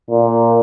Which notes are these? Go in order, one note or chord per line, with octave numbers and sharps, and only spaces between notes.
A#2